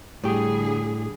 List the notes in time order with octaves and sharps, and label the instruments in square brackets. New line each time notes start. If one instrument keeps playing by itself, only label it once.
[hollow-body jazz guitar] A2 G4 [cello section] D3 G3 G#4